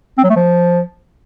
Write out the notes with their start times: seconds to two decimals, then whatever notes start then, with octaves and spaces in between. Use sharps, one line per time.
0.18 C4
0.24 F#3
0.30 A3
0.36 F3